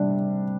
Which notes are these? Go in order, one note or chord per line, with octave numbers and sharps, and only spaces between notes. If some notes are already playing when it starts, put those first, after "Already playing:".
Already playing: C3 G3 D4